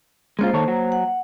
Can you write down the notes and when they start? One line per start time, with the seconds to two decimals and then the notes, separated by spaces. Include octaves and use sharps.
0.39 G#3 A#3 C#4 F4 C5
0.53 D#3 A4 C#5
0.68 F#3
0.92 F#5